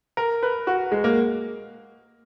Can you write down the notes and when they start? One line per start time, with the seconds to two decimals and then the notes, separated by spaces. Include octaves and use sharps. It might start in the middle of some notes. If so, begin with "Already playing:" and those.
0.17 A#4
0.43 B4
0.67 F#4
0.92 G#3
1.04 A#3